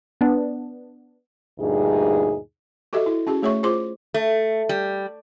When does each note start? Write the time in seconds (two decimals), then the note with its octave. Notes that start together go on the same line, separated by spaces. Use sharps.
0.21 B3 D4
1.59 D2 G2 A#2 D#4 G#4
2.93 F#4 G4 A4 D#5 E5
3.06 E4
3.27 C#4 F#4 G#4
3.42 A3 G#4 C#5 E5 C#6
3.63 F4 G#4 C5 C6 D6
4.14 A3
4.69 G3